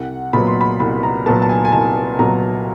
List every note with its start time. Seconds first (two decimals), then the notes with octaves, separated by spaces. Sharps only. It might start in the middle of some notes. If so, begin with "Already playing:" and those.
Already playing: C2 F#5
0.33 A#2 F#3 B3 B5
0.47 C6
0.61 B5
0.80 C2 B5
1.03 A#5
1.26 A#2 F#3 B3 A5
1.42 A5
1.49 G#5
1.65 G#5
1.72 C2 A5
2.19 A#2 F#3 B3 A#5